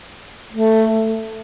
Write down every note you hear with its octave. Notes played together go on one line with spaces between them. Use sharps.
A3